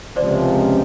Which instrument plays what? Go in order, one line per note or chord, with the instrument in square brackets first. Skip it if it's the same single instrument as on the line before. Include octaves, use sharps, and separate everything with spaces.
[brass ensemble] C#2 C3 F3 [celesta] C5 D5